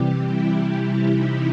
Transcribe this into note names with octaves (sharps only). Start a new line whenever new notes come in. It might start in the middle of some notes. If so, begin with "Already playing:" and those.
Already playing: C3 E3 G3 G4
E4
D#4